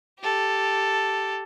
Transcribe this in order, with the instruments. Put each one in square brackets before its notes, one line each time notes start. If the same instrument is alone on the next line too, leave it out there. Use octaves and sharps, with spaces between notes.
[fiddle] G4 A4